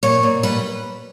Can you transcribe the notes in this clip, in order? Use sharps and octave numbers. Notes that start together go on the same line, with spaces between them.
A#2 C#5
A#2
G3 B4